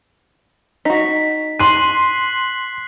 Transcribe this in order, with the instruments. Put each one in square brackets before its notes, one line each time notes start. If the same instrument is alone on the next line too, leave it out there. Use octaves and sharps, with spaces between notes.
[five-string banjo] D#4 F#4 [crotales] B6
[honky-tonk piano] C6 D#7 [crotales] F#6 C7 F#7